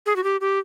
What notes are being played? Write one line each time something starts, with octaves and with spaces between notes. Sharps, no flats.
G#4
F#4
G4
G4